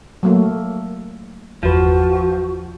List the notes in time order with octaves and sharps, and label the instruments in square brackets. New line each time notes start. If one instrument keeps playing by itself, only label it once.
[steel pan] F#3 A3 A#3
[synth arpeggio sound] G1 E2 B4 [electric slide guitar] F3 [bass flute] F#4